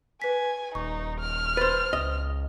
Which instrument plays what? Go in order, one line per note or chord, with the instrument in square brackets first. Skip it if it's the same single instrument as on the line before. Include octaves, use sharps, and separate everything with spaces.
[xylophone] B4 B6 [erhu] G#5
[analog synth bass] D#1 [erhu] D#4 [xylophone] C#6
[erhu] F6
[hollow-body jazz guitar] B4 C5 [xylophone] A6
[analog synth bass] C#2 [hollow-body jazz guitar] D#5